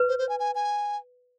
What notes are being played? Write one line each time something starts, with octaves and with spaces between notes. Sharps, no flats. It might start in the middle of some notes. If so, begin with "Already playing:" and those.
Already playing: B4
C5
C5
G#5
G#5
G#5